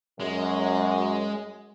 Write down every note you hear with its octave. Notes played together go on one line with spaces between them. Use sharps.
F#2 G#3